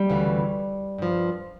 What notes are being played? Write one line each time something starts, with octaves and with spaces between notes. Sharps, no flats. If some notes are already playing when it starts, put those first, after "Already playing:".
Already playing: G3
D2 C#3 E3
G2 F3